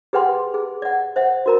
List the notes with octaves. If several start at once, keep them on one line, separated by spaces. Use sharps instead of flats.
G4 G#4 B4 F#5 G5 C6
G#4
D5 F#5
C5 E5 F#5
F#4 A#4 A#5